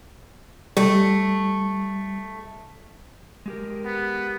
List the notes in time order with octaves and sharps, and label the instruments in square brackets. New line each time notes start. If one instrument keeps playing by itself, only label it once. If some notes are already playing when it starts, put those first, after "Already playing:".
[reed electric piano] G3 [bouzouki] A3
[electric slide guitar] G#3 G4 A#4
[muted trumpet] B3